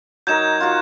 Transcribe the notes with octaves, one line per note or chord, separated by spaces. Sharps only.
F#3 D#4 A#4 G6 G#6 E7
F4 F#4